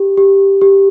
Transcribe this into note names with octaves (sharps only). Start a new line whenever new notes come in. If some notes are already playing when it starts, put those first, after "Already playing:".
Already playing: G4
G4
G4